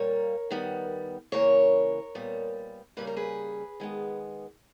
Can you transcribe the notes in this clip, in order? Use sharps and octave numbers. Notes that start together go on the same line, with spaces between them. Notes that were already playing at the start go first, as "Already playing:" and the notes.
Already playing: A#2 G3 A#3 A#4 C#5
D#3 G3 B3
C#3 E3 A#3 A#4 C#5
A#2 G3 B3
C#3 G3 A#3 B4
A#4
G#4 B4
D#3 G#3 B3